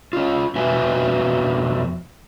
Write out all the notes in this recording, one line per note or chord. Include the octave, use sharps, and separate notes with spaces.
C#4 F4
F2 B2 F#4 B4 E5 G#5